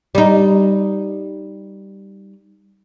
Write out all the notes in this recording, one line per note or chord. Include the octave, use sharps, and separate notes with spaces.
G3 D#4